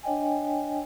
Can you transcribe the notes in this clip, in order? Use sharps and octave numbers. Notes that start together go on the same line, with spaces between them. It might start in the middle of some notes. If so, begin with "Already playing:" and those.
D4 C#5 D#5 G5 G#5